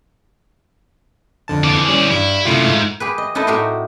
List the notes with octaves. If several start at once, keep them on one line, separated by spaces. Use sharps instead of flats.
F2 D3 A5
E3 D5
G3 C#4
G2 G3 E4
F#2 C3 A3 E4 F4
G#2
G4 G#4 B4
D#5
D#4 E4 A4 B4 D#5
A2 F#4 G4 A#5 C6